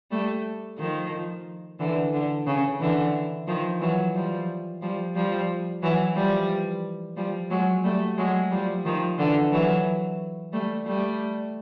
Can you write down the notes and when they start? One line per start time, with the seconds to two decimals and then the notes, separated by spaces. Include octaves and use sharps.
0.11 G3 A3
0.79 D#3 F3
1.79 D3 E3
2.13 D3
2.47 C#3
2.80 D3 E3
3.47 D#3 F3
3.81 E3 F#3
4.15 F3 G3
4.82 F3 G3
5.15 F3 G3
5.82 E3 F#3
6.16 F3 G3
7.17 F3 G3
7.50 F#3 G#3
7.84 G3 A3
8.18 F#3 G#3
8.51 F3 G3
8.85 D#3 F3
9.18 D3 E3
9.52 E3 F#3
10.53 G3 A3
10.86 G3 A3